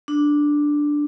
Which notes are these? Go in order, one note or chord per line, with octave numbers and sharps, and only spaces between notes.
D4